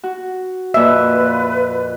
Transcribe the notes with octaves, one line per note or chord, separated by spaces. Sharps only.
F#4
F2 A#2 F4 B4 E5 E6